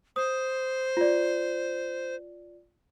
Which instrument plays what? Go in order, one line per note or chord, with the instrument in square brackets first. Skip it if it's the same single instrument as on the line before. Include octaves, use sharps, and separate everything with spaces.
[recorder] C5 [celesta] D#6
[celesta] F4 D5